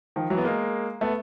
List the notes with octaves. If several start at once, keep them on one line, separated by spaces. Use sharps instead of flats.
D#3 F3
E3 F#3
B3
G#3 A#3
A3 B3